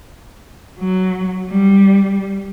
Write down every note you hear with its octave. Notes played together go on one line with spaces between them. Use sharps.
F#3
G3